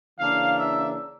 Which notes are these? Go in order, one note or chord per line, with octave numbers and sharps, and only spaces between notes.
C#3 E3 A#3 D4 F5
E5